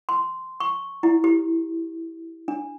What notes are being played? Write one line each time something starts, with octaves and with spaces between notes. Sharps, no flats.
C6
C#6
E4
G4
D4